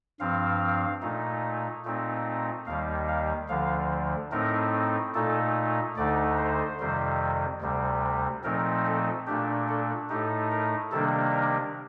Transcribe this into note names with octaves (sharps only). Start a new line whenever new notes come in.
G2 F3 C4 F5
A#2 A3 D#4
A#2 A3 C4 D#4
D#2 D#3 G3 F5
F5
D2 D3 F3 F5
A2 A3 C4 D#4 A#4
A#2 A3 D#4 A4
D2 D3 A3 D#4 D5
C5
F2 C3 D#3 G3
D2 C3 G3
A#2 F3 A3 C4 D#4 A#4
A4
A#2 A3 D4 G4
A4
A2 A3 D#4 G4
A#4
C3 D#3 G3 A#3 D4 A4
A#4